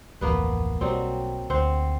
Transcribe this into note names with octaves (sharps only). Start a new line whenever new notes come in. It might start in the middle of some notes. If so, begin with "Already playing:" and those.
D1 A1 F2 A#3 B3 B4
B1 F#3 G3 C4
D2 C4 C5 F#5